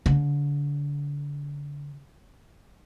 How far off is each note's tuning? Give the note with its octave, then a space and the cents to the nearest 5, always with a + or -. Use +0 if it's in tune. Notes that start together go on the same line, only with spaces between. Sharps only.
D3 -30